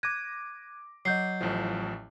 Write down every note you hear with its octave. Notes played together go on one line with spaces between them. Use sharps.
D6 F#6 G#6 A#6 D#7
F#3 D#5 G6 C7
A1 A2 F3